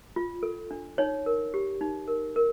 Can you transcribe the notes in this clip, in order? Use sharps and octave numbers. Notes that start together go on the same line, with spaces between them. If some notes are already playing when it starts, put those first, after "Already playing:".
F4
A4
D4
D#4 C#5
A#4
G4
D#4
A#4
A#4